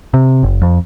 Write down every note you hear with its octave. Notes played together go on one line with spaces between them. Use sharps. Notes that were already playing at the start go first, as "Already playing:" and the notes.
C3
F#1
F2